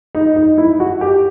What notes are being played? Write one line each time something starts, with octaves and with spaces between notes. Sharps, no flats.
D#4
D#4
E4
F#4
G4